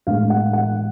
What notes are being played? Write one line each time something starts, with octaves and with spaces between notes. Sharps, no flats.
A2 E3 G#3 B3 F5
F#5
F#5